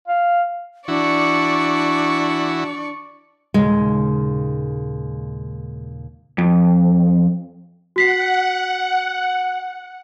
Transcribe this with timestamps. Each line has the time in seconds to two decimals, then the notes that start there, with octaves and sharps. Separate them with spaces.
0.08 F5
0.88 E3 D4 E4 F#4 D5 C#6
3.54 D#2 A#2 C#3 G#3
6.38 F2
7.96 F#4 F#5 B6 C7